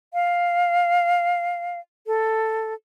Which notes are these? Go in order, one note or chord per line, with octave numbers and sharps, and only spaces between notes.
F5
A4